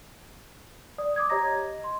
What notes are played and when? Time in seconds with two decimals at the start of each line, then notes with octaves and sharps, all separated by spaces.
0.98 D5 D#6
1.16 D6 D#6 G#6
1.30 G4 C#5 D#5 A#5 G#6 A#6
1.52 D#5
1.84 C6